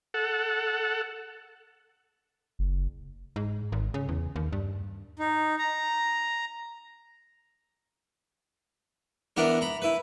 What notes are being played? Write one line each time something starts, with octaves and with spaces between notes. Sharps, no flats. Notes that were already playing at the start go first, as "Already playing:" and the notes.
A4 F#5
F#1
G#2
G#1
C#3
E2
D#2
G2
D#4
A#5
E3 B3 D4 A#4
A#5 B5
E4 B4